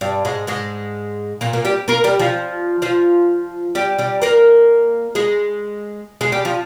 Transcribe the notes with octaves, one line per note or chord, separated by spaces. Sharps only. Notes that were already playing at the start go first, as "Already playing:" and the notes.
G2 G3
G#2 G#3
G#2 G#3
A#2 A#3
A#2 A#3
G3 G4
A#3 A#4
G3 G4
F3 F4
F3 F4
G3 G4
G3 G4
A#3 A#4
G#3 G#4
G#3 G#4
G3 G4
F3 F4